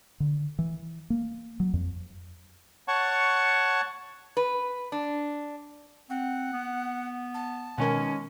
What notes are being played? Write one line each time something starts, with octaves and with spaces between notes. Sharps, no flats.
D3
E3
A#3
F#3
F2
C#5 F#5 A5 C#6
B4
D4
C4 F#5
B3
A5
B2 D#3 G#3 C#4 A#4